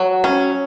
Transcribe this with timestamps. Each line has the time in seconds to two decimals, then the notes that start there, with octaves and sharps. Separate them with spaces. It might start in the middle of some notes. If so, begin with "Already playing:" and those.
Already playing: F#3
0.24 C#4